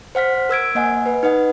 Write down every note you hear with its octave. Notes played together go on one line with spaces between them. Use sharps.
C5 F#5 F6 B6
A#4 E6 G#6 D7
A#3 D#5 F#5 G#5
B4
D#4 B4 D#5 F#5